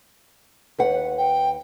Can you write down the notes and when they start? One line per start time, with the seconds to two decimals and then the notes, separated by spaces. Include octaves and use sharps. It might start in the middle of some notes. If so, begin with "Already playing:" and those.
0.79 D#2 B4 F#5
1.18 G5